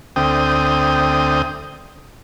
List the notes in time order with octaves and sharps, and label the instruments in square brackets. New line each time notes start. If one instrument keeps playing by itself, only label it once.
[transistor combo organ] D2 C4 G5 D#6